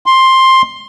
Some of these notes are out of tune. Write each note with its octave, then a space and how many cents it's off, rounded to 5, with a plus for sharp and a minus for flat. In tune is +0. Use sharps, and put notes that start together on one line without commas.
C6 +10